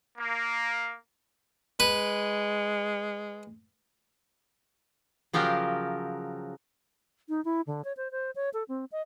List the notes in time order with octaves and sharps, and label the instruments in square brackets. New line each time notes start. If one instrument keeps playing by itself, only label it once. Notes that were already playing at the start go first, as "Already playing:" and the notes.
[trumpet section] A#3
[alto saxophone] G#3 [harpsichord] B4
[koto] C#3 F3 F#3 G4 A#4
[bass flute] D#4
E4
D3
C#5
C5
C5
C#5
A4
C4
D#5